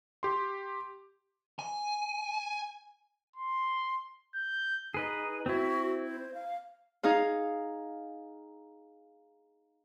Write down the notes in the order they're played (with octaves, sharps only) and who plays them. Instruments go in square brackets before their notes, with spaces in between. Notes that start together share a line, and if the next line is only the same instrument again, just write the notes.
[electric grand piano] G4 C6
[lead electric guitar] G#5
[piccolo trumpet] C6
G6
[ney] D#4 [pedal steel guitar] G#4 B4 D#5
[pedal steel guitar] C4 E4 [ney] F#4
[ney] C5
F5
[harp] D#4 G#4 F5